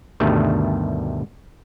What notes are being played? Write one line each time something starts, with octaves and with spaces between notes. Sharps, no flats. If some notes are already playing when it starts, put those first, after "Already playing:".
D2 G2 B2 D#3 G3 A3